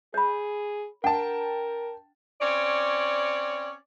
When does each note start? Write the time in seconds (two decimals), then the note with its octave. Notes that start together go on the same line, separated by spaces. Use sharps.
0.14 G#4 C#5 B5
1.04 D4 A#4 F#5 G5 A5
2.41 C4 C#4 C#5 D5